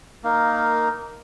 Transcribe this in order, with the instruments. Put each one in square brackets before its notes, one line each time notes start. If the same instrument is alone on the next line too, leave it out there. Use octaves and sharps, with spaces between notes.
[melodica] A#3 D#4 A#4 F5